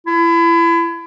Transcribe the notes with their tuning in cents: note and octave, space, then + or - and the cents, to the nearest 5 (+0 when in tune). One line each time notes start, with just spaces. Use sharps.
E4 +30